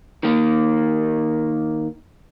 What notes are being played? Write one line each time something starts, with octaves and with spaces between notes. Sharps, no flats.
D#3 A#3